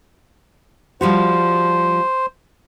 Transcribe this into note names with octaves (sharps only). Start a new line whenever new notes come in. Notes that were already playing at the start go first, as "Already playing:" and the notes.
F3 G3 F#4 C5